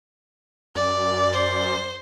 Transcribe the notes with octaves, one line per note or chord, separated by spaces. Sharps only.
F#2 D5
C5